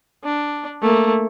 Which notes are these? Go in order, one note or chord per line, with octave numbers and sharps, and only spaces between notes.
D4
A3 A#3